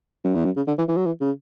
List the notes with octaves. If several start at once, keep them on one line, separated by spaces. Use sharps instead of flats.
F#2
E2
F#2
C#3
D3
E3
E3
F#3
E3
C#3